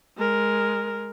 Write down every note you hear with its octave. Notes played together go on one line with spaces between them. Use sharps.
G#3 A#4